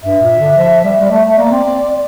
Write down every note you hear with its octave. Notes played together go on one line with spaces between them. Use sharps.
G2 E5
A#2
D3
F3
G3
G3 D5
A3 E5
A3
A#3 D5
C4
C4